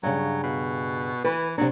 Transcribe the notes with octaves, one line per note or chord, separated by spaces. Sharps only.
G2 C#3 F#3
B2
E3 B4
C3 F#3 D4